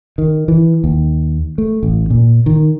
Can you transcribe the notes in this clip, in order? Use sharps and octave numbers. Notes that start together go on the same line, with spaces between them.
D#3
E3
D#2
A3
A1
A#2
D#3